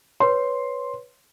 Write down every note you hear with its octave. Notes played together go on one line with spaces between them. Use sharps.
B4 C#5 C6